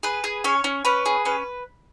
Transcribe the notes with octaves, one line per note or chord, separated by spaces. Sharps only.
G#4 B4
G#4
C#4 C#5
C#4
C#4 B4
G#4
C#4 B4